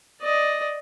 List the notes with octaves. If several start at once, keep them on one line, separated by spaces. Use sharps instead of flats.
D5 D#5